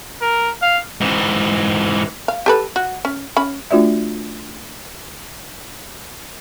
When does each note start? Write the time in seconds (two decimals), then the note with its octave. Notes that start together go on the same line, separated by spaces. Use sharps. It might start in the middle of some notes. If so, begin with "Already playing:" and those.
0.21 A#4
0.62 F5
1.01 G#2 E3
2.28 F5
2.46 G4 A4 B4
2.76 F#4
3.05 C#4
3.37 C#4 B5
3.71 A3 D4 F4 F#4 D5 E5